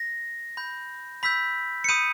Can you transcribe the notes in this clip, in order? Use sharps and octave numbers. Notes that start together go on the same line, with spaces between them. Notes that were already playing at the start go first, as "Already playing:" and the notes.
Already playing: A#6
B5 G6
B5 E6 G6 B6
C#7
B5 D#6 G6 D#7